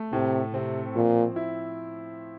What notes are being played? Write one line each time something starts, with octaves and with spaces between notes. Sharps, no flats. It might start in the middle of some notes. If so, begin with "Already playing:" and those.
Already playing: A3
A2 C3
C3 C4
A#2 F3
E4